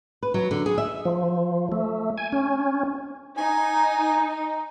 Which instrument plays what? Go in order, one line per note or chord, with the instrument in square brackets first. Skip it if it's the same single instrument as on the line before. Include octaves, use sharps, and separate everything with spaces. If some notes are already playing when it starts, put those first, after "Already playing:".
[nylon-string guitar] B4
F#3
D3
G#4
E5
[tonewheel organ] F3
A3
G#5
C#4
[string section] D#4 [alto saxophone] G#5